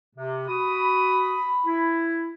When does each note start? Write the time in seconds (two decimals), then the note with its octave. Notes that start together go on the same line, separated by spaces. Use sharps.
0.16 C3
0.48 F#4 B5 D#6
1.66 E4